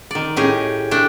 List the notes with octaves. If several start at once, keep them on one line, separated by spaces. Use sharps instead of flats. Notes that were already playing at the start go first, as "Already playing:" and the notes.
D#3 D5
A2 C#4 G4 G#4
A3 D4 G5